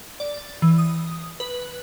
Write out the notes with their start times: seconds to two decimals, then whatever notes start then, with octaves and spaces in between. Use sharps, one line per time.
0.20 D5
0.62 E3
0.78 D#6
1.40 B4